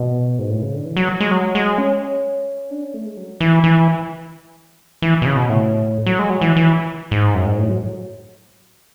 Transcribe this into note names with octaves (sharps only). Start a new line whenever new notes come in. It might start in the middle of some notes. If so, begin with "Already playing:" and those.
Already playing: B2
G#2
A2
C#3
D3
E3
F#3
G#3
F#3
G#3
C#4
D4
C#4
A3
G#3
F#3
E3
E3
E3
B2
C#3
B2
A2
F#3
G#3
F#3
E3
E3
G#2
F#2
G#2
A2
F#3